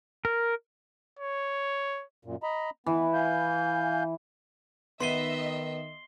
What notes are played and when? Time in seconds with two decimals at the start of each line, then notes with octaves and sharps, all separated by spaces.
0.25 A#4
1.19 C#5
2.25 F#2 A#2
2.43 D#5 A#5 B5
2.86 E3 B3
3.14 F5 G#5 G6
5.00 D#3 B3 D#5 E5 C6 C7 D#7 G7